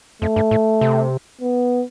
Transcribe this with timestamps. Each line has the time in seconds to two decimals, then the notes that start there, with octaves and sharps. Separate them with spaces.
0.22 F2 A3
0.36 G2
0.51 A2
0.81 C3
1.41 B3